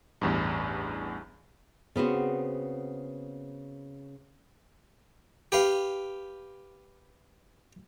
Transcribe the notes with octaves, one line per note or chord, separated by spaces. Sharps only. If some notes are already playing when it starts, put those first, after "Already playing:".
A1 E2 G2
C#3 B3 C4 F#4
G4 B4 F5